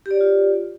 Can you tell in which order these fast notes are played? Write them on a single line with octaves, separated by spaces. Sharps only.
G4 D5 C#5 F4